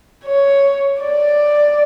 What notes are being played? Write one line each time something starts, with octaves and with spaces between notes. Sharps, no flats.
C#5
D5